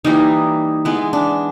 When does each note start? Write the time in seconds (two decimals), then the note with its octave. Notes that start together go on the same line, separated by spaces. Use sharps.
0.05 E3 G3 A#3 D#4
0.85 E3 G#3 B3
1.13 D4